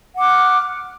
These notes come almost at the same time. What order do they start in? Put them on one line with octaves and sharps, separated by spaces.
F#5 D6 F#6 F6